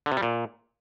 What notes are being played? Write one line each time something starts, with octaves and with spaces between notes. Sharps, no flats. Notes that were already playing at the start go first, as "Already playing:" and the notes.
D3
C3
G3
A#2